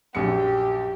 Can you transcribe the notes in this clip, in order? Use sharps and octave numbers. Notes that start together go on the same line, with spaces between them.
A#1 F#2 G4 C#7